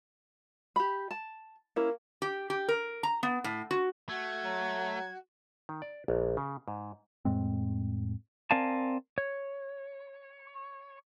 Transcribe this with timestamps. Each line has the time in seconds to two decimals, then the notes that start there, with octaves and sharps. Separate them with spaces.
0.76 G4 B5
1.11 A5
1.76 A#3 C#4 E4
2.22 G4
2.50 G4
2.68 A#4
3.03 A#5
3.23 B3
3.44 A2
3.71 F#4
4.09 A3 F#4 G#6
4.44 F#3
5.69 D#3
5.82 D5
6.08 A#1
6.37 C#3
6.68 G#2
7.25 F2 A2 G#3 C4
8.51 C4 A#4 D5 F5 G#5 A5
9.18 C#5